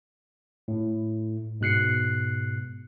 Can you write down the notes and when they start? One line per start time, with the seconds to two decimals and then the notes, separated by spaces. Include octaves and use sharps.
0.68 A2
1.61 G#2 B2 F#6 C7 C#7